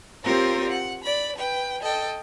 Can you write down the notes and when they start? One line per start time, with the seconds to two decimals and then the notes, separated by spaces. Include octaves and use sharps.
0.24 C4 F4 G4 A#4 C#5
0.69 F#5
1.04 D5 B5
1.36 B4 G5
1.81 A4 D#5 G5